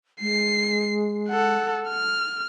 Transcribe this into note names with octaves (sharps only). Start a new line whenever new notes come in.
G#3 C7
A4 F#5
F6